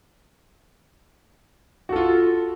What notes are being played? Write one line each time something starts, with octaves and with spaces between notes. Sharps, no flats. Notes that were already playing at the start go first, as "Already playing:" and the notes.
F4 F#4 A4